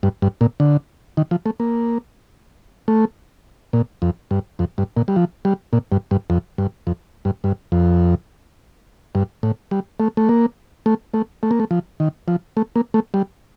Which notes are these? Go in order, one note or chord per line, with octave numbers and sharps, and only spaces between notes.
G2
G2
A#2
D3
D#3
F3
A3
A#3
A3
A#2
F2
G2
F2
G2
A#2
G3
F3
G3
A#2
G2
G2
F2
G2
F2
G2
G2
F2
G2
A2
G3
A3
A3
A#3
A3
A3
A3
A#3
A3
F3
D#3
F3
A3
A#3
A3
G3